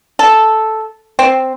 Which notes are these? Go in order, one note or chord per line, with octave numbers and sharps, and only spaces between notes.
A4
C4